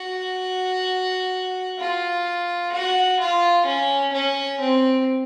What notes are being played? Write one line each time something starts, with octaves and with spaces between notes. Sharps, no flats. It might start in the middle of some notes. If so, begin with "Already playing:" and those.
Already playing: F#4
F4
F#4
F4
C#4
C#4
C4